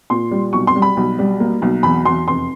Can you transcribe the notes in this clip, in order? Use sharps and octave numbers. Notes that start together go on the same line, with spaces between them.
A#2 C6
G3
B1 C#6
C6
G3
B5
B1
G3
A#3
B1
E2 B5
E2 C6
F1 C6